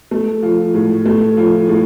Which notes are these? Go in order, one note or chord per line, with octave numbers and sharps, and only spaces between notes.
A3
F3
A2
A3
F3
A2